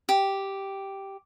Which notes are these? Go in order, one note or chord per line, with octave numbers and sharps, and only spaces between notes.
G4